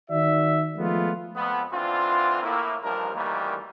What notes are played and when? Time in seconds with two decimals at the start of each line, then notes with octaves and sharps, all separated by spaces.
0.11 D#3 F#4 D5 E5
0.77 F3 G#3 A3 B3 F4
1.36 F2 B3
1.72 D3 E3 C4 D4 F4
2.43 A2 A#3 E4
2.83 A1 D#2 F3 G3 D4 A#4
3.15 D2 D#3 E3 G3 A#3